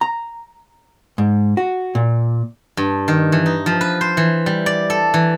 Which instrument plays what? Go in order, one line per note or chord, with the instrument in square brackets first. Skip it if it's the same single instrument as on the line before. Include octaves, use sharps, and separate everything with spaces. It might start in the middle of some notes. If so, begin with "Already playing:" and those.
[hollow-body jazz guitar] A#5
G#2
F#4
A#2
[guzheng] G2
D#3
E3
D#4
F3
B4
C5
E3
G3
D5
A4
E3